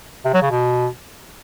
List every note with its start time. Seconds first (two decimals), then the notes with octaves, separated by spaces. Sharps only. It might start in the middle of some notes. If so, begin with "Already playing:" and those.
0.25 C3
0.33 F#3
0.42 C#3
0.51 B2